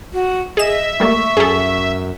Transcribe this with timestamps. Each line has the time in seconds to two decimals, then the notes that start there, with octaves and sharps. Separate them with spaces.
0.13 F#4
0.57 G#4 D#5 E5 E7
1.00 G3 A3 A#3 C#6
1.37 F#2 G#4 A4